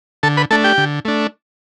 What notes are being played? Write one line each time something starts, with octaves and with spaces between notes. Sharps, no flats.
D3 A4 A5
B4 B5
A3 D4 A4 A5
G4 G5
D3
A3 D4